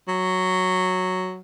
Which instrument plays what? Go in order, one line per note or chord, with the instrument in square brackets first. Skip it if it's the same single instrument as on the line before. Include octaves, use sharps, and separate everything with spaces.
[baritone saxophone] F#3